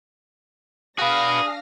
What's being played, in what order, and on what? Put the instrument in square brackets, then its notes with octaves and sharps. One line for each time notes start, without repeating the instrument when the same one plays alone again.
[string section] D4 F5 A#6 [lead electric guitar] F#4 B4 [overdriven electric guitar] G#4